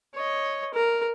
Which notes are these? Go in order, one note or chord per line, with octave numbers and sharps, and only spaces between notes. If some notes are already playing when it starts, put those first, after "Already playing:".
C#5 D#5
A#4